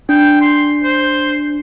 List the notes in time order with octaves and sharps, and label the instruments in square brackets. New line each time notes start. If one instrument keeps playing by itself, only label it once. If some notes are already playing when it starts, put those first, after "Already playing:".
[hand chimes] D4 [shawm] G5
[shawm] C6
C5